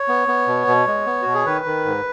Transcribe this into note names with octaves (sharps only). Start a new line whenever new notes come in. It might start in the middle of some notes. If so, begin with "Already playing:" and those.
Already playing: C#5
B3
B3
B2
B2
G#3
B3
B2 F#4
G#4
D#3 B4
D#3
G#2